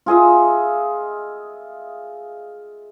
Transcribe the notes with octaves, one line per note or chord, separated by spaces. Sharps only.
F4 G#4 D#5 E5